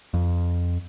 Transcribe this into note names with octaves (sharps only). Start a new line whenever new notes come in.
F2